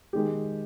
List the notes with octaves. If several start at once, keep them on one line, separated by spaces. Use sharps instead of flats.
D#3 G#3 G4